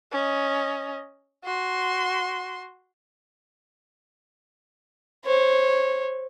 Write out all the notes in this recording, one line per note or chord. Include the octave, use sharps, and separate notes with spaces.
C#4 D#5
F#4 C6
C5 C#5